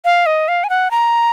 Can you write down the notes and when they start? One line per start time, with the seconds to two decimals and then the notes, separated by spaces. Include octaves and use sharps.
0.05 F5
0.26 D#5
0.48 F5
0.64 G#5
0.70 F#5
0.91 A#5